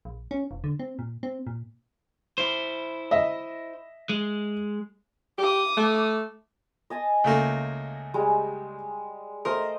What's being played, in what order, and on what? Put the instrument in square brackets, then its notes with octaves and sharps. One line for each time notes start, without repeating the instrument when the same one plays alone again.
[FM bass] A#1
C#4
E1
D3
C4
A#2
C4
A#2
[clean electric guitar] E4 C5
[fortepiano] D#5 E5
[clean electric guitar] G#3
[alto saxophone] G4 [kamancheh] D6 D#6
[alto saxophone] A3
[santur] D#5 G#5 A5
[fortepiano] C#2 A3 A#3
[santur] G3 G#3
[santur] A3 C5 D#5 [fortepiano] A#4